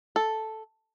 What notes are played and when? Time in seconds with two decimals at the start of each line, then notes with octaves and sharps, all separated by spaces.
0.16 A4